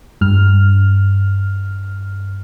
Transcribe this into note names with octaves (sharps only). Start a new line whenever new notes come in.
G2 F6